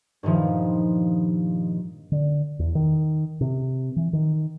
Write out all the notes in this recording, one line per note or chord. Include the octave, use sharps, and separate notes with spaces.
G2 A#2 D#3 F3
D3
E2
D#3
C3
E3
D#3